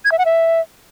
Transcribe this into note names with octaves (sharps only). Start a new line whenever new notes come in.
G#6
E5
F#5
E5